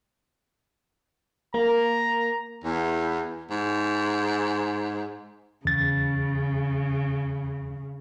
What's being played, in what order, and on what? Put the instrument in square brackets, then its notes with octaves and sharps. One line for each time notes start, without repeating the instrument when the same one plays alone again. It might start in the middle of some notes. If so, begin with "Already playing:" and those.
[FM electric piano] A#3 [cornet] A#5
[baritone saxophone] E2
G#2
[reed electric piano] E2 A6 [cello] C#3